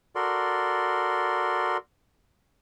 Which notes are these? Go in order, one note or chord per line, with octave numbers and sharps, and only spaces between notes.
F#4 A4 A#4 D5 C6